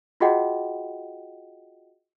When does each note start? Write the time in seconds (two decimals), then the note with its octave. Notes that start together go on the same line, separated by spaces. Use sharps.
0.20 F4 F#4 G#4 D#5 F#5 G5